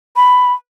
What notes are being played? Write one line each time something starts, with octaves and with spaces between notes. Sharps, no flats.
B5